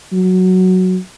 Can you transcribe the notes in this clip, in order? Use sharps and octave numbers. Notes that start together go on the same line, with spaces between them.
F#3